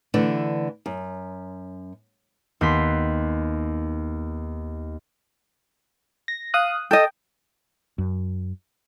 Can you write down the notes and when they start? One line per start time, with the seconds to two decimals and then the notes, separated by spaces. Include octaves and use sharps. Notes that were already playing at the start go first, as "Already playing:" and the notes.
0.14 D3 E3 A3 D4
0.86 F#2
2.61 D#2 B3 C6 B6
6.28 A#6
6.54 F5 D#6 F#6
6.91 A4 D#5 G5
7.98 F#2